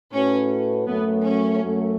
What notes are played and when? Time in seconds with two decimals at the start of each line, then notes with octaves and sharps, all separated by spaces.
0.13 A2 A3 C#4 F#4 B4
0.88 F#2 F#3 A3 B3
1.25 C#4
1.63 F#2 F#3 A3